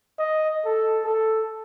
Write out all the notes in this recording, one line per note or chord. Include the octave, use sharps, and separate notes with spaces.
D#5
A4
A4